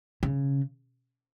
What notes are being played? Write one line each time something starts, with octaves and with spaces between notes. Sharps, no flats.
C#3